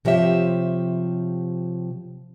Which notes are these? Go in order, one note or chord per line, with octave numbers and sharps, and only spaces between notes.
C3 F3 G4 C#5 E5